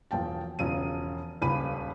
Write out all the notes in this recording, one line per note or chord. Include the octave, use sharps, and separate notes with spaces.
E1 F3 G5 A5
E1 C#3 F3 D#7
D#1 C#2 B5 D#7